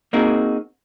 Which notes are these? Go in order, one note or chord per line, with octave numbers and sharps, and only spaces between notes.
A#3 C4 D#4 F#4 G#4 A#4